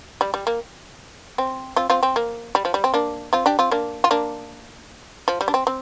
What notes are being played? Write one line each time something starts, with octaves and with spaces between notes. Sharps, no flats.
G3
G3
A#3
C4
C4 F4
C4 F4
C4
A#3
G3
F3
G3
C4
A#3 D4
C4 F4
D4 G4
C4 F4
A#3 D4
F4
A#3 D4
F3
G3
D4
C4
C4